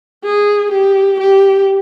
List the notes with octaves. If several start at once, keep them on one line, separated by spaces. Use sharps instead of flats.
G#4
G4
G4